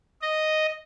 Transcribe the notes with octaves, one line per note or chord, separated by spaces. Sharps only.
D#5